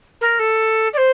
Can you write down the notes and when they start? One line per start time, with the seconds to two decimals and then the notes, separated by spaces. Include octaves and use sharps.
0.21 A#4
0.39 A4
0.93 D5
0.97 C5